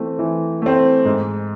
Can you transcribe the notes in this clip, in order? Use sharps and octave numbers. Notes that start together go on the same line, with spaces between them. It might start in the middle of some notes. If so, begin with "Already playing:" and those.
Already playing: E3 A3 C4
E3
A3 C4
G#2